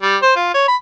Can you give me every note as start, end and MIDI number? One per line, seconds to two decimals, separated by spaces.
0.02 0.17 55
0.22 0.31 72
0.36 0.52 65
0.54 0.64 73
0.68 0.76 83